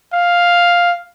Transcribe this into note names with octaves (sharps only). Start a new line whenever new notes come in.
F5